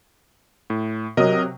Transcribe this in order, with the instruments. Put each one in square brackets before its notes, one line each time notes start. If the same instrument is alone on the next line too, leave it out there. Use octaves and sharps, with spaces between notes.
[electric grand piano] A2
[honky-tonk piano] C3 F#3 D#6 [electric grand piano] A#4 D#5